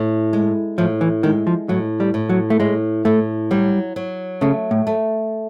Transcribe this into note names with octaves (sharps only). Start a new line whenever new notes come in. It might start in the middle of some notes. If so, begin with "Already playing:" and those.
Already playing: A2
G#3
A2 F3
E3
D#3 G#3
F3
A2 F#3
G3
A2
F#3
A3
A2 G#3
A2 A3
F#3 G3
F#3
C#3 A3
A2
A3